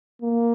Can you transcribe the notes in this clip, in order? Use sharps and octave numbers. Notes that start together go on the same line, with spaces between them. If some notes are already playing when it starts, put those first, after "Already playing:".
A#3